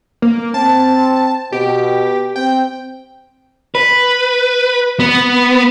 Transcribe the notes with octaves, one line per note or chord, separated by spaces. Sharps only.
A#3
C4 A5
B2 G4
C4 G5
B4
B3